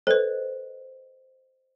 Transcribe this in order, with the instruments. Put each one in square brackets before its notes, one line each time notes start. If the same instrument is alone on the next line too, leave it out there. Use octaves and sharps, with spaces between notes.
[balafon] A4 B4 [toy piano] C5 D#5